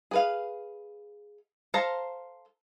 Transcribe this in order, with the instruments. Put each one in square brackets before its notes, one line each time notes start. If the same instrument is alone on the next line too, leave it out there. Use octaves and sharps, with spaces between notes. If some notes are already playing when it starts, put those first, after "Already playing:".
[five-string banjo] G#4 B4 F5
A4 C5 F5 A5 A#5